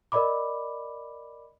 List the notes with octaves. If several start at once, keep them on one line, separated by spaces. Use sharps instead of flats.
A#4 D5 D#5 B5 D6